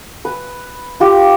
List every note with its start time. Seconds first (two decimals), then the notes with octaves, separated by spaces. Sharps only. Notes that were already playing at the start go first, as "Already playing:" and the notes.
0.25 B4
1.00 F4 G4